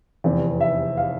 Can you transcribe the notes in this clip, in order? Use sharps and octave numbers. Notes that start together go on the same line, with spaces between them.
F1 E2 C3 D5
E5
F5